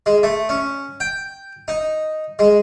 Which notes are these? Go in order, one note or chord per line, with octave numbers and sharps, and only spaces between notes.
G#3
A3
C#4
G5
D#4
G#3